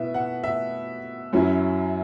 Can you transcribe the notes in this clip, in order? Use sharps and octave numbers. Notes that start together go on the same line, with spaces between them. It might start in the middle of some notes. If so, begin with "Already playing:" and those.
Already playing: B2 B3 E4 B4 E5
F#5
E5
F#2 F#3 C#4 E4